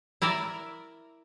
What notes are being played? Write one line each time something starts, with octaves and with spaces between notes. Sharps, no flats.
E4 A#4 D5 E5